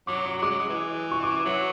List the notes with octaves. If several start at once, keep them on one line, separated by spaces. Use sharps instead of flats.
F#3 D6
D6
F#3
G#3 D6
F#3
G#3
E3
C#6
D6
F#3